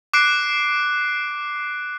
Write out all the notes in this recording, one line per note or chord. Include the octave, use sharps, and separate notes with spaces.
D6 F#6 C7 D7